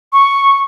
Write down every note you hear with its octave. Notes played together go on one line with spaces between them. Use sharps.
C#6